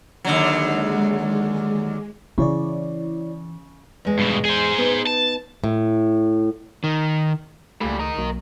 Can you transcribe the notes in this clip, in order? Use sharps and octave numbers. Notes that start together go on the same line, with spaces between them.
D#2 D3 F#3
G#3
C#3 E3 E4 C#5 D5
E2 G#3
G2 B2
G#4 C5
B3 D#4
A5
A2
D#3
C#2 A#2 G3 A3
A#4 D#5
B1 F#3 A#3